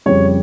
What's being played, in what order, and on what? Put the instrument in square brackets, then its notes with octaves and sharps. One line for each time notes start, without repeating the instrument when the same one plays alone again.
[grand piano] F2 C#3 G3 C#5